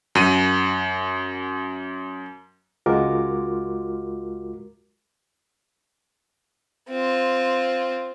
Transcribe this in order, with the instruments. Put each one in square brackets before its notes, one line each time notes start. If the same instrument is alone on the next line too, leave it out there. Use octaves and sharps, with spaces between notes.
[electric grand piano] F#2 D#7
[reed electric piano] C#2 G#3 F4 F#4 A#4 D6
[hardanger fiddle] C4 F4